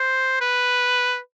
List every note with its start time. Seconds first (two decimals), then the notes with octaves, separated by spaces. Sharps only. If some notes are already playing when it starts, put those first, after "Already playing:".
Already playing: C5
0.41 B4